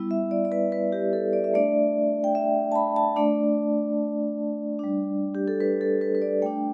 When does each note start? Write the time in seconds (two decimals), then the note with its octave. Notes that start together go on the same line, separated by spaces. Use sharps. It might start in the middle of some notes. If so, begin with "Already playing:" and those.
Already playing: G3 B3 E4
0.11 E5
0.31 D5
0.45 D5
0.52 B4
0.72 B4
0.92 G4
1.13 A4
1.33 D5
1.44 E5
1.54 A3 D4 D5
2.24 G5
2.35 E5
2.72 A5
2.75 B5
2.96 A5
3.16 A3 D4 D5
4.79 G3 D4
5.35 G4
5.48 A4
5.60 B4
5.81 A4
6.01 B4
6.15 B4
6.22 D5
6.42 A3 D4 G5